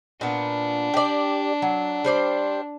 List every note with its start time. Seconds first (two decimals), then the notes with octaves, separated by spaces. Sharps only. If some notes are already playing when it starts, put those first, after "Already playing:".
0.21 A#2 B3 D4
0.94 G4 D5
1.62 F#3
2.04 G3 C5 D5